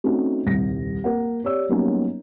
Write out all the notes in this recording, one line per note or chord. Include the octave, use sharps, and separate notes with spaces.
A3 C4 C#4 D#4 F#4
D#1 C2 A#6
A#3 A#4 F#5
G4 C#5 D5 E6
F#3 G3 A#3 B3 C#4 D#4